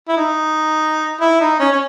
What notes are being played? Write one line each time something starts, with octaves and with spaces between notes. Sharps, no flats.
E4
D#4
E4
D#4
C#4
C#4